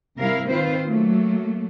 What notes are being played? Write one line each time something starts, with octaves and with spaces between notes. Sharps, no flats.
C3 G3 E4 A#4 F5
D#3 C4 F4 B4 C5
F#3 A3 A#3